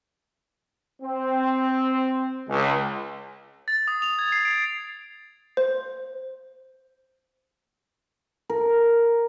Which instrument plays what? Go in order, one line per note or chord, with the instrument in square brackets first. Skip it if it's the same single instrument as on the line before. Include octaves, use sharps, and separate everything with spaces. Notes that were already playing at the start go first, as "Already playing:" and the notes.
[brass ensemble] C4
C#2
[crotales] A6
D#6
F7
G#6
C7
D7
[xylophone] C5
[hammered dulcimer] A#4